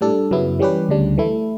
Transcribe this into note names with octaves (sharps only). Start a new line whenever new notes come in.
A2 G3 D4 A4
F#2 C#3 F#3 B3 E4
E3 G3 C#4 G4 B4
D2 C#3 G3 D4
E3 A3 E4